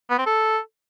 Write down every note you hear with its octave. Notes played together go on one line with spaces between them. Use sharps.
B3
C4
A4